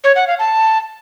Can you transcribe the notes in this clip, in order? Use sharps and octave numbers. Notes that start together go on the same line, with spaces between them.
C#5
F#5
F5
A5